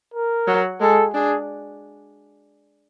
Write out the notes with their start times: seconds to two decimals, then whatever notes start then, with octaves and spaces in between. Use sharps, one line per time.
0.14 A#4
0.47 F#3
0.81 G#3 A4
1.14 D4 G#4